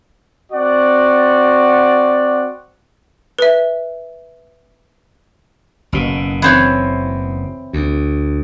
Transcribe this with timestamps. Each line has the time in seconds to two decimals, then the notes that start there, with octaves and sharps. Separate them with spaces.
0.52 C4 F#4 D5 F#5
3.39 B4 E5
5.92 F#1 B2
6.42 E3 C4 C#5
7.73 D2